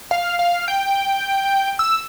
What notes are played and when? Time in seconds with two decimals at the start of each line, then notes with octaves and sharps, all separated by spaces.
0.11 F5
0.39 F5
0.68 G5
1.79 E6